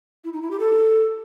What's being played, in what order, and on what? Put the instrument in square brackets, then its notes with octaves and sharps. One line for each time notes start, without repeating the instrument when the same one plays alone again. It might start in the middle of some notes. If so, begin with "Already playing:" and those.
[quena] E4
D#4
E4
G4
A4